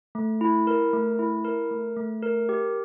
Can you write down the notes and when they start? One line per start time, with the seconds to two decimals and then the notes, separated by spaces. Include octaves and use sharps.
0.15 A3
0.41 E4
0.67 A#4
0.93 A3
1.19 E4
1.45 A#4
1.71 A3
1.97 A3
2.22 A#4
2.49 G4